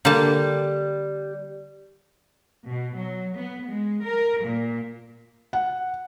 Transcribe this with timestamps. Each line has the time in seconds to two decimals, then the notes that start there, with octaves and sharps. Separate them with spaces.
0.05 D3 G3 A#3 A5
2.68 B2
2.98 F#3
3.38 B3
3.70 G#3
4.04 A#4
4.44 A#2
5.53 F#5